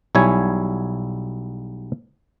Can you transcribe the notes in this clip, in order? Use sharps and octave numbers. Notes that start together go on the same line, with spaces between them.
B1 G3 E4 C#5 G#5